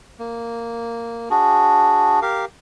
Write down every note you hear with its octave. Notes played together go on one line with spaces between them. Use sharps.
A#3
D4 F#4 G#4
G4 A#4 F5